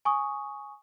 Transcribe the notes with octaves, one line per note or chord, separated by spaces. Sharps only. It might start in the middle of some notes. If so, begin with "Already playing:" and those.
G#5 C#6 D#6